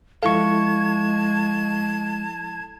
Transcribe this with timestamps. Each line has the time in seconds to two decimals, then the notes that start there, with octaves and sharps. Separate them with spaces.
0.23 F3 G#3 E4 A4 F5 A5 C#6 G#6